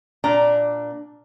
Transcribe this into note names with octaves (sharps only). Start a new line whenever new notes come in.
A#2 D4 A#5